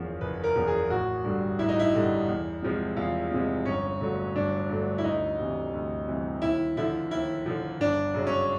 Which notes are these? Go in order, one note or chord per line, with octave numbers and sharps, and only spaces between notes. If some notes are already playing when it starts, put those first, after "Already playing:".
Already playing: F#1 E2 C#3 F3
F#1 B4
A#4
E2 C#3 F3
G#4
A1 F#4
G2 D3 G3
A1 E4
D#4
E4
G2 D3 G3
E2
C3 F3 G#3
E2 F4
C3 F3 G#3
G1 C#4
G2 D3 F#3 A3
G1 D4
G2 D3 F#3 A3
E4
D2 D#4
C3 E3 G3
D2
C3 E3 G3
D#2 E4
D3 F3 E4
D#2 E4
D3 F3
G1 D4
F#2 C#3 F#3
C#4